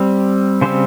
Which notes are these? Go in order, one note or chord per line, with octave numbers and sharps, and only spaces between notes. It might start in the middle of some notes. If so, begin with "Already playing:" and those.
Already playing: G3 C4
C#3 G3 C4 C5